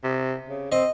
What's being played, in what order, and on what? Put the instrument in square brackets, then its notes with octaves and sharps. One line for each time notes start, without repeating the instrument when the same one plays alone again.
[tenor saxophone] C3
C#3
[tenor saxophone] C4 [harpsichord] D#5